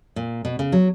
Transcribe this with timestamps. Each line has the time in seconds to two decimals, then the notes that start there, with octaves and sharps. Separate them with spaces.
0.16 A#2
0.45 B2
0.59 C#3
0.72 F#3